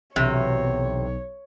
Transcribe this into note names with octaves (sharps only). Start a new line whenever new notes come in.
B1 E2 C3 C#5